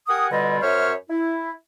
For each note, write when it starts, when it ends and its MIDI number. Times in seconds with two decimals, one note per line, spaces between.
0.08 0.28 67
0.08 0.28 70
0.08 0.28 78
0.08 0.28 80
0.08 0.28 87
0.31 0.59 47
0.31 0.59 50
0.31 0.59 55
0.31 0.59 65
0.31 0.59 71
0.31 0.59 75
0.61 0.92 42
0.61 0.92 72
0.61 0.92 73
0.61 0.92 76
0.61 0.92 85
0.61 0.92 89
1.10 1.51 64